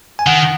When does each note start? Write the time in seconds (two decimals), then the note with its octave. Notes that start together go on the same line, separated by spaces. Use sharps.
0.19 G#5
0.26 D#3 F#5